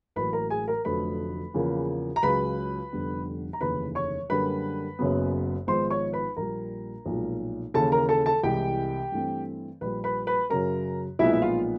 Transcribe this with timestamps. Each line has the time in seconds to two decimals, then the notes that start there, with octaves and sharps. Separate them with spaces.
0.16 A1 A2 F#3 A#3 B4 B5
0.33 A#4 A#5
0.50 G#4 G#5
0.68 A#4 A#5
0.85 F1 F2 D3 F#3 A3 B4 B5
1.54 E2 C#3 F3 A#3
2.16 A#5
2.23 C#2 C#3 F#3 B4 B5
2.92 F1 F2 D3 G3 B3
3.53 A#5
3.61 F1 D#2 C#3 E3 B4 B5
3.95 C#5 C#6
4.29 F#2 D3 G3 A#3 B4 B5
4.99 F#1 F#2 C#3 F#3 B3
5.67 G#1 G#2 F3 G#3 B3 C5 C6
5.90 C#5 C#6
6.13 B4 B5
6.37 A#1 A#2 G3 A#4 A#5
7.06 B1 A#2 F3 G#3
7.74 D#2 C#3 E3 A4 A5
7.92 A#4 A#5
8.09 A4 A5
8.26 A4 A5
8.43 C2 C3 E3 G#3 G4 G5
9.12 G2 E3 A3 C4
9.81 A#1 A#2 G3 B4 B5
10.04 B4 B5
10.27 B4 B5
10.50 F#2 C#3 F#3 A#4 A#5
11.19 B1 A#2 F3 G#3 B3 E4 E5
11.33 E5
11.42 F4 F5